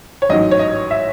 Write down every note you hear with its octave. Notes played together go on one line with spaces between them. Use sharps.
C#5
A1 G#2 F#3 D#5
C#5
D#5
E5